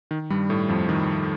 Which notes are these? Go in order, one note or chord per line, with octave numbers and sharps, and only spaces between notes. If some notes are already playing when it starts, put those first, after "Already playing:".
D#3
G2 G3
A2 A3
F2 F3
D#3